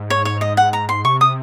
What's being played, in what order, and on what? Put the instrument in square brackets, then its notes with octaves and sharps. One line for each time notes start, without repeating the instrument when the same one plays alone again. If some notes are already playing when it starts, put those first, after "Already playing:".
Already playing: [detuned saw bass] G#2
[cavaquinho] C#5
C#5
D#5
F#5
A#5
C6
[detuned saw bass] C3 [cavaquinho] C#6
[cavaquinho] D#6